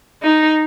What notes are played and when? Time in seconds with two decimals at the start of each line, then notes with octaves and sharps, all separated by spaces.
0.22 D#4